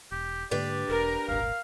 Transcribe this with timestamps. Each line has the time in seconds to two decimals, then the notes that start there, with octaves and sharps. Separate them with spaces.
0.12 E1 G4
0.51 G#2 D3 A#3 D4 G4 B4 D5
0.89 E1 A#4
1.28 D#1 G#1 F5